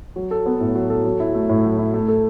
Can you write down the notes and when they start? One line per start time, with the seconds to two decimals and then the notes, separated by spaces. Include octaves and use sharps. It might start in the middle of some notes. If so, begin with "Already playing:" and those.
0.16 F#3
0.31 A4
0.46 B3
0.60 A2
0.75 F#3
0.90 A4
1.04 F#3
1.20 E4
1.34 A3
1.49 A2
1.64 F#3
1.78 E4
1.94 A3
2.08 A4